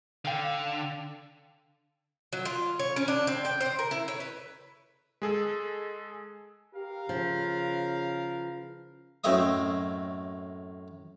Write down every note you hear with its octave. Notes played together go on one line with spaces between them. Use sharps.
D3 F5 G5
F#3
F4
C#5
C#4
D4
C4
G5
C5
A#4
E4
C#5
B4
G#3 G#4 A4
G4 A#4 B4 F5
C#3 F3
F#2 A2 C4 D#5 E5 D#6